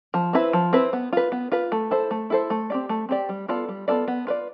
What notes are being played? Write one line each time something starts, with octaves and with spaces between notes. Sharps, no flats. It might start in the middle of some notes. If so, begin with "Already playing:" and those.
F3
C4 E4 B4
F3
C4 E4 B4
B3
F4 B4
B3
F4 B4
A3
E4 A4 C5
A3
E4 A4 C5
A3
C4 G4 D5
A3
C4 G4 D5
G3
B3 F4 A4 D5
G3
B3 F4 A4 D5
B3
F4 B4 D5